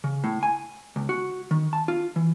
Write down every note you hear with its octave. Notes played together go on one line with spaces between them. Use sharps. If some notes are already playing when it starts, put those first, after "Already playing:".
C#3
A2
G#5
C#2
F#4
D#3
A5
F4
E3